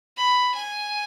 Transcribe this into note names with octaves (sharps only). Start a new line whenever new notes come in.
B5
G#5